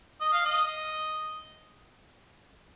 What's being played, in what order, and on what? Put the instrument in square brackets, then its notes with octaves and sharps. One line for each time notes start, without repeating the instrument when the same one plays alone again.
[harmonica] D#5
F5
D#5